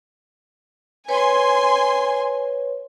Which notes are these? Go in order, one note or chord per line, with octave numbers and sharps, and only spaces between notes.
B4 C#5 G#5 C6